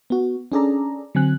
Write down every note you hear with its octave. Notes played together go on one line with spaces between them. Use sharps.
B3 F#4
C#4 D4 G#4 A4 D5 A#5
D3 F#3 C4 G#5 F#6